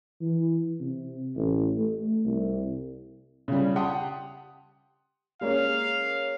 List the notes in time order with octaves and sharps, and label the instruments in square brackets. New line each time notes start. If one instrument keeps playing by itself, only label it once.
[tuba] E3
C3
A1
A3
C2
[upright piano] C#3 G3
G4 F#5 G5 A5 C6 D#6
[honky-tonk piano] G#3 A#3 C#4 [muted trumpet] F5